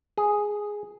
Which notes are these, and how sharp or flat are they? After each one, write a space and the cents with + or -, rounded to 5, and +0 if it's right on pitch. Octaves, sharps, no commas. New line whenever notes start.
G#4 +0